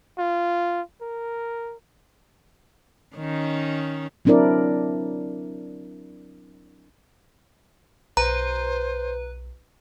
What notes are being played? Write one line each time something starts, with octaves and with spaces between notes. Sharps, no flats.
F4
A#4
D#3 C#4 D#4
F#3 C4 D4 E4 A#4 D5
B1 B4 C5 A#5